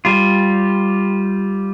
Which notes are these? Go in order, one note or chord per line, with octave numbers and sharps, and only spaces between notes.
G3 F4